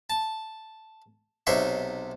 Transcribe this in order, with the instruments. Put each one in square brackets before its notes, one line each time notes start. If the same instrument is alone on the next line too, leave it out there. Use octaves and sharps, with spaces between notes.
[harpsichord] A5
B1 C3 D#4 C#5 E5 C6